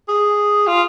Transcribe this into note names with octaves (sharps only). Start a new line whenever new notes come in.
G#4
F4